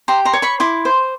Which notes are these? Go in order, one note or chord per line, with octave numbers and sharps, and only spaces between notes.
G4 A#5 C6
A#5 C6
C#5
B5 C#6
E4 C6 D6
C5